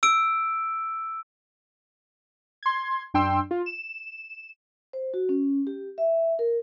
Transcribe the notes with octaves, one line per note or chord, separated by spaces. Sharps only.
E6 D7
C6 G#6
F#2 D4 G5 C6 E6
F4
E7
C5
F#4
C#4
G4
E5
A#4